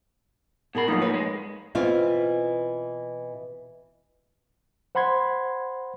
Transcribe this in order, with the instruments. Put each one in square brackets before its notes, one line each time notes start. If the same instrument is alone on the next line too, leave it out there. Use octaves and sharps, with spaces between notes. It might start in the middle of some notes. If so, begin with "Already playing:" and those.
[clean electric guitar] B2 B5 [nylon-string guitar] B3 G#4 A#4
[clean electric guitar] B2 F3 D#4 [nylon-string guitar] F#3 A#3
[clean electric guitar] D#2 B4 [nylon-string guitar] C#5
[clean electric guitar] G#3
[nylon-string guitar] B2 E3 C4 F4
[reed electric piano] C5 F#5 B5 C6 G#6